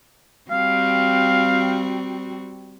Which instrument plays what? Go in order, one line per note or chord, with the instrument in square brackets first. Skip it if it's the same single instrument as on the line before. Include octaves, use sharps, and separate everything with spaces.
[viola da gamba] G3 C4 F#4 [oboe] F5